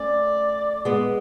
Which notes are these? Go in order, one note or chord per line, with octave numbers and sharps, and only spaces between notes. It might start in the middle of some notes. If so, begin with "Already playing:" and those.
Already playing: A3 C#4 D5
G#3 B3